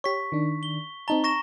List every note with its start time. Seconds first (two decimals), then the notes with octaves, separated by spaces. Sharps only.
0.04 G4 C#5 C#6 B6
0.32 D#3 D4
0.63 G7
1.08 C4 D#4 A5 A#5 G7
1.24 C#6 A#6 E7